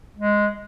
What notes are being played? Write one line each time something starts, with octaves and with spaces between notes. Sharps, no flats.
G#3